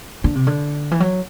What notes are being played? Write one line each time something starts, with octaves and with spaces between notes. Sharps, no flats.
D3
C3
D3
E3
F#3